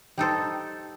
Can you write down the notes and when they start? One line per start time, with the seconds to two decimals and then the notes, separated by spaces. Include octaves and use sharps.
0.18 G3 D#4 A4 C5